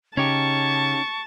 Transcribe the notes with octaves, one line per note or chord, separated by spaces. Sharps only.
C#3 C#4 D#4 G4 A5 C#6